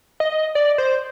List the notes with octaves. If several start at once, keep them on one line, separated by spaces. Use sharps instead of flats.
D#5
D5
C5